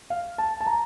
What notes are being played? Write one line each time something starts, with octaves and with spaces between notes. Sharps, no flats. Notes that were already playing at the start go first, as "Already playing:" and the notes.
F5
A5
A5
A#5